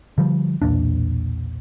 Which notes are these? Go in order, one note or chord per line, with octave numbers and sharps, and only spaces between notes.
D3 F3 G3
B1 E2 A#2 D4